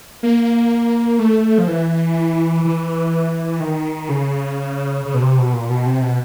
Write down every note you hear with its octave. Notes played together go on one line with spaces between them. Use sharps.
A#3
A3
F3
E3
E3
D#3
C#3
C#3
B2
C3
B2
A#2
B2
C3
B2